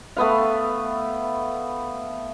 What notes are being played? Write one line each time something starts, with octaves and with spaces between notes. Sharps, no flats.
A3 B3 B4 F5